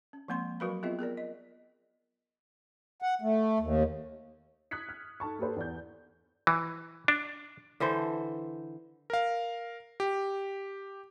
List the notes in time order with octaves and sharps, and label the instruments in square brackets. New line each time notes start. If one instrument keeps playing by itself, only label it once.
[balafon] C#4
F3 G#3 A#3 C4 C6
F#3 F#4 A#4 B4 F5 B5
B3 C4 F4 G#4 D#5 E5
B3 G#4 A#4 D5
D#5
[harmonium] F#5
A3
D#2
[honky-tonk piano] D#6 F#6 G#6 B6 C#7
F6
D#4 A4 A5 C#6
A#3 G4 A4 B4 C5
E2 D5 G6
[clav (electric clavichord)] E3
D4
[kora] D3 E3 A4 C5
[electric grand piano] A#4 F5
G4